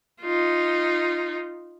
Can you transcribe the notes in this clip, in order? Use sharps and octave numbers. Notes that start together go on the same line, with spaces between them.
D#4 F4